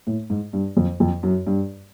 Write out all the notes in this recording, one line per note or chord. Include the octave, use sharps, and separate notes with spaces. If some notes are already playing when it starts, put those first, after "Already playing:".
A2
G#2
G2
F2
F2
F#2
G2